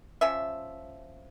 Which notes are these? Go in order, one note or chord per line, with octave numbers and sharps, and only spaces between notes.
F3 C#4 E5